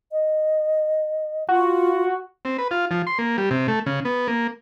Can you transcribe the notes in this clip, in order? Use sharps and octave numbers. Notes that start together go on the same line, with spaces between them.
D#5
F4 F#4
C4
B4
F4
F3
C6
A#3
G3
C3
A3
C#3
B3
A#3